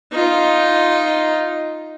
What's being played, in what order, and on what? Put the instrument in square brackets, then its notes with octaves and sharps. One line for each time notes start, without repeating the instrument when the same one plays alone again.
[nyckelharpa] D#4 F4